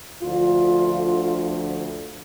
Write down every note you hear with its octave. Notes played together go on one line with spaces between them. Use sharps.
D2 D3 F3 F4